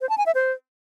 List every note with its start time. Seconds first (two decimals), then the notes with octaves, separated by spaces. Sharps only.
0.01 C5
0.09 A5
0.18 G#5
0.26 E5
0.35 C5